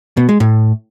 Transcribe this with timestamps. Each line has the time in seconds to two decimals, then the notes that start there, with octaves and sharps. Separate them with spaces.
0.17 B2
0.29 G#3
0.40 A2